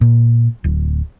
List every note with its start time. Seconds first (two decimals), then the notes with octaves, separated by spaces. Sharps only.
0.01 A#2
0.64 D1